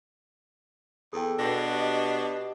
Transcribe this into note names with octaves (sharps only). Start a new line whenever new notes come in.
E2 G#4 A4 G5
B2 D4 A#6
G4 D#5